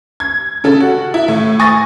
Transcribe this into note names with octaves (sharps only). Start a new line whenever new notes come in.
G#6
C#3 A4
F#4
E4
A2
G#5 C#6 D#6 A6 A#6